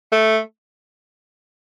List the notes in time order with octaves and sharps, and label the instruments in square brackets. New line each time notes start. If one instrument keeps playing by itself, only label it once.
[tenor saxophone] A3